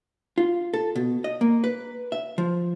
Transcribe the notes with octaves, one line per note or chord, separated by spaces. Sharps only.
F4
A4
B2
D#5
A#3
B4
E5
F3